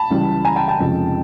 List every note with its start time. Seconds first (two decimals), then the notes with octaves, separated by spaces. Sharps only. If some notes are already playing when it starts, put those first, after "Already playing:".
Already playing: A5 B5
0.10 C#2 C#3 E3 G3
0.45 G#5 A#5
0.56 G5 A5
0.68 G5 A5
0.79 F1 F2 C#3 F3 G#3